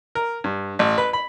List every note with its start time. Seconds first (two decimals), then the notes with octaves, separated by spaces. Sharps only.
0.15 A#4
0.44 G2
0.79 A1
0.98 B4
1.13 B5